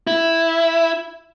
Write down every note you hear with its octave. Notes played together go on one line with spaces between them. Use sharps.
E4